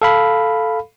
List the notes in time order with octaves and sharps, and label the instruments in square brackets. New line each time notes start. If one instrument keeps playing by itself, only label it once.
[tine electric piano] A4 F5 B5